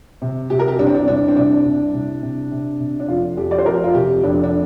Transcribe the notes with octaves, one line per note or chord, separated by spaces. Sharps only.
C3
C3 G4
A#4
G4
C2 D4
C4
D4
C2 D4
C4
C3 D4
C2
C3
C3
C3
C3
D4
F1 F4
F2 G4
D5
C5
F1 A#4
F4
C3 G4
F1 D4
D4